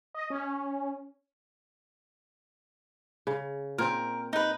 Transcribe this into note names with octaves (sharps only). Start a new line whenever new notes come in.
D#5
C#4
C#3
A#2 C4 A#4
D#4 B4